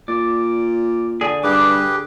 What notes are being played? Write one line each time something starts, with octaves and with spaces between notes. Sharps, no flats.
A#2 D5
D3 G#4 G#5
G2 G4 G#4 B4 D6